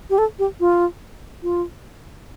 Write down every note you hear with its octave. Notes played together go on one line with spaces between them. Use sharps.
G4
A4
G4
F4
F4